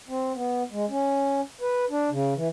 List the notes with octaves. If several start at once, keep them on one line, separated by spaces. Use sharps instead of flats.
C4
B3
G#3
C#4
B4
D4
C#3
E3